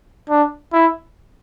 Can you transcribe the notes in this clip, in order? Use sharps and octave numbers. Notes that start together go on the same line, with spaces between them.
D4
E4